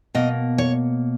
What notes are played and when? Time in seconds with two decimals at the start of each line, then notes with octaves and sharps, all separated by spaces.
0.15 B2 A#3 D#5
0.58 C#5